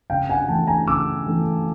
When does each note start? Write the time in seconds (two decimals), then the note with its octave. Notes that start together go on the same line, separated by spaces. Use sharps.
0.10 C#3 F5 G5
0.30 F#5 G#5
0.48 E3 A3 G5 A5
0.67 G#5 A#5
0.87 C#3 D6 E6
1.26 E3 A3